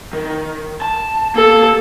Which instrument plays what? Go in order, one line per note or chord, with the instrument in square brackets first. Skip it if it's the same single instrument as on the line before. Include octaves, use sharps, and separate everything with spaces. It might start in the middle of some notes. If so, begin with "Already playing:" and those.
[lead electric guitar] D#3
A5
[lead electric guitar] A#3 [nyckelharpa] A4